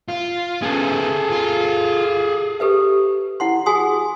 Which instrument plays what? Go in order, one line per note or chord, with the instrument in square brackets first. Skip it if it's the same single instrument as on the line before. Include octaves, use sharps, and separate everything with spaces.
[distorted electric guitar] F4
[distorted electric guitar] C#3 B3 [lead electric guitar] G#4 A4
[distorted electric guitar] F4
[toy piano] G4 A4 B4 E5
E4 F#5 C6
F#4 G#4 G#5 C6 D#6